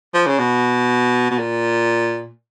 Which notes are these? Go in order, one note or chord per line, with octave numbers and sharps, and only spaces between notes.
F3
C#3
B2
B2
A#2